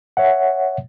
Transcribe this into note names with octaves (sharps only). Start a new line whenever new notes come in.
C#5 E5 F#5